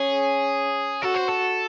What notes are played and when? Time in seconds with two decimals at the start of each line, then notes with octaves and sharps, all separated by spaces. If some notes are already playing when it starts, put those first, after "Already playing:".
Already playing: C#4 G#4
1.01 F#4 A4
1.14 C5
1.28 A4